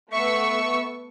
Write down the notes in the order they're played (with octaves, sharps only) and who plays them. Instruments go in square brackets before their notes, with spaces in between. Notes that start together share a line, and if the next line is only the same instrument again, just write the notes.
[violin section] A3 B3 E6 [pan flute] E5 [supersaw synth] C#6